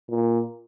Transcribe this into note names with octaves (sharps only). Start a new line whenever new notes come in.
A#2